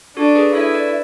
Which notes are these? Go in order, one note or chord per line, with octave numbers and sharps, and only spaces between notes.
D4 F#4 A4
G#4 B4
E4 A4 C#5
B4 D5